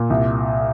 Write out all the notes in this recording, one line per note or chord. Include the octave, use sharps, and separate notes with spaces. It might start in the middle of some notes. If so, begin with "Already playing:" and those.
Already playing: A#2
C2